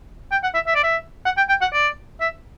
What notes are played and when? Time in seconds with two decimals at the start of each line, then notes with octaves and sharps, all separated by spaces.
0.32 G5
0.43 F#5
0.54 E5
0.67 E5
0.75 D5
0.83 E5
1.25 F#5
1.37 G5
1.49 G5
1.62 F#5
1.73 D5
2.20 E5